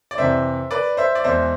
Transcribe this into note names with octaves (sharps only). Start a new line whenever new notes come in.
D5
F2 C3 E3 C5 E5
B4 D5
C5 E5
D5
E2 B2 G#3 C5 E5